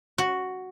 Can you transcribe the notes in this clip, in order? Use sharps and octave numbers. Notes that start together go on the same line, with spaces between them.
F#4